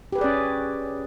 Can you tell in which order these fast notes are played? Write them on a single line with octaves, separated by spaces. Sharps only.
G4 B4 G#4 D5 C#4